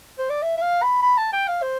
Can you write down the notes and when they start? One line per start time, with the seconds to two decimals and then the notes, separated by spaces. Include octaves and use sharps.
0.19 C5
0.30 D5
0.42 E5
0.57 E5
0.62 F5
0.82 B5
1.03 B5
1.18 A5
1.33 G5
1.48 F5
1.62 C5